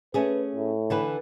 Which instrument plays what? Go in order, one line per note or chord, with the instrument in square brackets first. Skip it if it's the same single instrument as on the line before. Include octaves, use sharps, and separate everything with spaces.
[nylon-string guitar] A3 C#4 G#4 [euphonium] B4
[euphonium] A2
[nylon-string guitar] D3 E3 B4